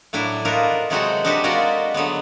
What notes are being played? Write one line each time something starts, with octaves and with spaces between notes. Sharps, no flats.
A2 F#3 D4 E4
D4 D#4 F4 F#4 A#4 B4
C3 F#3 G#3 C4 F#4 A4
D4 D#4 F#4 G4 A4 B4
G#3 F4 F#4 A#4 D5
D3 F#3 G#3 B3